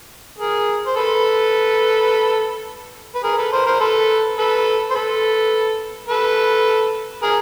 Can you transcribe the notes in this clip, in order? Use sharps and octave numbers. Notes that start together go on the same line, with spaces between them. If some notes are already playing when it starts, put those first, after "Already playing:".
G#4 A#4
C5
A4 B4
B4
G#4 A#4
A4 B4
A#4 C5
A#4 C5
A4 B4
A4 B4
C5
A4 B4
A4 B4
G#4 A#4